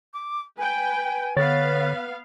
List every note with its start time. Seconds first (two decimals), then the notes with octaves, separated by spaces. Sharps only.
0.13 D6
0.57 B4 G5 G#5
1.37 D3 B3 B4 C#5 F5 A6